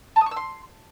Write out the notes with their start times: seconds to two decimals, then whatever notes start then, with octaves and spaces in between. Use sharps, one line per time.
0.16 A5
0.21 D#6
0.26 C#6
0.31 E6
0.36 C6